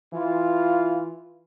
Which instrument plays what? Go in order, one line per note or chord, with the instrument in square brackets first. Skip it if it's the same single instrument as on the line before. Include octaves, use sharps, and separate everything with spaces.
[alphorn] E3 [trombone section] F4